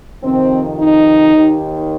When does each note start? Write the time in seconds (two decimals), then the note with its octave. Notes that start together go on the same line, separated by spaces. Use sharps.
0.22 F2 C3 D#3 C4
0.78 D#4
1.34 D#2 D#3